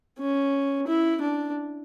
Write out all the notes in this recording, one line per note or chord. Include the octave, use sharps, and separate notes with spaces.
C#4
E4
D4